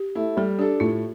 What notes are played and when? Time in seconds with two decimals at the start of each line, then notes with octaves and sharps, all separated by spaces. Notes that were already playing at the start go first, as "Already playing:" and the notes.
Already playing: G4
0.15 A3 E4
0.37 G3 A4
0.58 D4 G4 A4
0.80 A2 F4